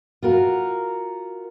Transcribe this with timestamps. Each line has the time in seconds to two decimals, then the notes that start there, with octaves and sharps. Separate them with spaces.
0.22 F4 F#4 A#4